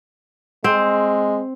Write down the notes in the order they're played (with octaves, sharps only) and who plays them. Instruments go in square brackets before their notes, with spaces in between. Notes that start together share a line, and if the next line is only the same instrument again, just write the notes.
[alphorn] G#3 [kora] C4